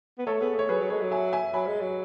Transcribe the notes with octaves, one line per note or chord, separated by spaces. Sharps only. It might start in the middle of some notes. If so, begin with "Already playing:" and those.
B3
A3 A4 C#5
B3 G#4
A3 C#5
F#3 G#4 B4
F#3
G#3 A4 C#5
F#3
E5 G#5
E5 G#5
F#3 G#5 B5
G#3
F#3